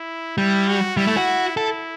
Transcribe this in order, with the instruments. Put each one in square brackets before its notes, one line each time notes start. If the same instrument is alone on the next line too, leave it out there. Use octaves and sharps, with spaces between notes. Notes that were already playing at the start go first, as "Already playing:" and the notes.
Already playing: [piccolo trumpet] E4
[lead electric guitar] G3 [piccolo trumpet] E4
[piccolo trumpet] F#4
[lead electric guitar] G3 [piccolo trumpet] E4
[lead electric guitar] A3
F#4
[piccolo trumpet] E4 [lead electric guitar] A4